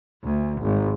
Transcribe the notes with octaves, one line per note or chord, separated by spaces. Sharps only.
D2
G#1